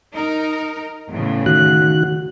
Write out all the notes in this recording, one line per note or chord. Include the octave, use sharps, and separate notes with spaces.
D#4 A#4
E2 A2 C#3
D#3 F#4 F#6